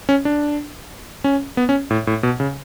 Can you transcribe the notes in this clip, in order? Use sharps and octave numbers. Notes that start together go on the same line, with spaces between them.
C#4
D4
C#4
B3
C#4
A2
A2
B2
C#3